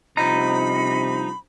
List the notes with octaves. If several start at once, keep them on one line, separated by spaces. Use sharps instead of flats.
G2 C3 F3 D#4 A#5 B5